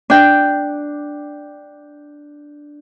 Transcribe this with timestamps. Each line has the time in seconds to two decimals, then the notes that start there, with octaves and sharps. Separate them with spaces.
0.10 D4 G5